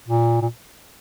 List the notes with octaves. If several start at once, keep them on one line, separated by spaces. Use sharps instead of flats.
A#2
A#2